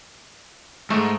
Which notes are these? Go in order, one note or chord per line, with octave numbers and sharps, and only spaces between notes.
G#2 A3